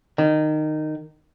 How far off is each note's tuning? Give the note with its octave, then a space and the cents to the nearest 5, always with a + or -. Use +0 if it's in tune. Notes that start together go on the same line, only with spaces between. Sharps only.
D#3 -15